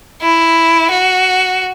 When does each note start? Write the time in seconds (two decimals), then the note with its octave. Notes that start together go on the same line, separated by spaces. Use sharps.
0.22 E4
0.90 F#4